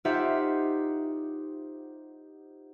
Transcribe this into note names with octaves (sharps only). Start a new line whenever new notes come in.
D#4 F4 G4 C5 E5 F#5